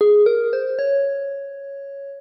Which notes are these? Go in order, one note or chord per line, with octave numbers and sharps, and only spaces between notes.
G#4
A#4
C5
C#5